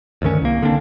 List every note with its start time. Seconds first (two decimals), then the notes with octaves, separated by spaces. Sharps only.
0.22 D2 G2 D#3 C#4
0.42 C2 A#3
0.62 D3 A#3 C4 D4